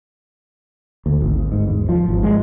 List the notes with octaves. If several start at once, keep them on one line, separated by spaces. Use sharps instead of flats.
D2
G#1
G#2
E2
F3
G#1
G#3